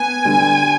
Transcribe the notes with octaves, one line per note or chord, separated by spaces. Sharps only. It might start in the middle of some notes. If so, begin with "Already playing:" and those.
Already playing: B3 G#5
D3 G3